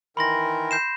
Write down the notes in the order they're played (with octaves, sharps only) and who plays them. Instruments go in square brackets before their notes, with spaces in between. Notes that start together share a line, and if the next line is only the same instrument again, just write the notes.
[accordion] D#3 E3 A#4 [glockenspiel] B5 C6 A#6
[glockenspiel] G6 C7 E7